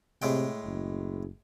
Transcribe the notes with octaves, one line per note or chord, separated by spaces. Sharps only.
A2 C3 G#3 G5
F#1